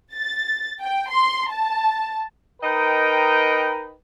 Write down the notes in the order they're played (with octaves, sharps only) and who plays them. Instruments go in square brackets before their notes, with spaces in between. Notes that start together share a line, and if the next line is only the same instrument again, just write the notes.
[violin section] A6
G5
C6
A5
[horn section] D#4 A#4 B4 D#5 G5